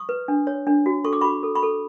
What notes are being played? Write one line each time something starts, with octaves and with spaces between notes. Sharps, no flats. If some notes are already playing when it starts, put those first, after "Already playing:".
Already playing: C#6 D#6
B4
D4
C#5
D4
F#4
A4 C#6
D6
F#4 B5 C#6
A4
B5 C#6
A4